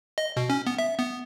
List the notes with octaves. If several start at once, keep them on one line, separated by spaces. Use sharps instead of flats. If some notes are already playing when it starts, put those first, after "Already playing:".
D#5
B2
C#4
B3
E5
B3